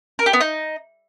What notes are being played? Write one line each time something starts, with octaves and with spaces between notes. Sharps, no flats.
A#4
G4
B3
D#4